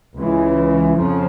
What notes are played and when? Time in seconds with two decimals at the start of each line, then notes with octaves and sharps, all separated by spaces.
0.17 C#2 C#3 E3
0.95 F2 C#3 F3